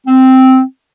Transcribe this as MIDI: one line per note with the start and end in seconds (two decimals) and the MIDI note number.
0.06 0.60 60